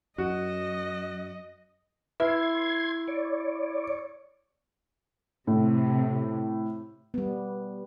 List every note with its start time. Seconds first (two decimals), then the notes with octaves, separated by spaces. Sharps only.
0.18 F#2 F#4 D#5
2.20 E4 B4 E5 C6 G#6
3.08 C#5 D5
5.47 A2 C3
7.14 G3 B3